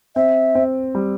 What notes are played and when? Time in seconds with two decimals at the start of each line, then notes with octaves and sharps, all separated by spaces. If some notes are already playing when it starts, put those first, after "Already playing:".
0.16 C4 E5
0.55 C4
0.95 G3